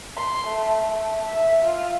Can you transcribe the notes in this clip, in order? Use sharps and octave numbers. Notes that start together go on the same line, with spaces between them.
C6
A3
A3
E5
F4